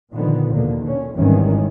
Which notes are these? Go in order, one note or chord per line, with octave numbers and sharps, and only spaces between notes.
A#2 D3 D#3 F3 B3
D#2 B2 D3 A#3
D3 C#4
G#1 E2 D#3 E3 G3 C#4